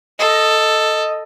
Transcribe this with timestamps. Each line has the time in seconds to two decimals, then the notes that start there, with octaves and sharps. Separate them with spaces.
0.19 A4 D#5